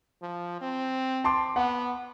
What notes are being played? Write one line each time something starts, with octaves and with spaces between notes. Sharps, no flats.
F3
C4
A5 C6 D6
B3 F#5